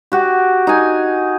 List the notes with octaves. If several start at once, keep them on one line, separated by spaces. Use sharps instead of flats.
F#4 G4
D#4 G#5